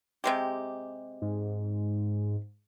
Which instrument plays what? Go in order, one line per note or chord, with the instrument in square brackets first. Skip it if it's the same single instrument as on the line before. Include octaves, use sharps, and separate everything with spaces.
[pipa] C3 G#3 G4
[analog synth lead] G#2